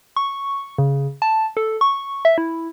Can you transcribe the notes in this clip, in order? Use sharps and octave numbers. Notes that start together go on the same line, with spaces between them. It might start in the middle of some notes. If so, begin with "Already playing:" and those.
C#6
C#3
A5
A4
C#6
E5
E4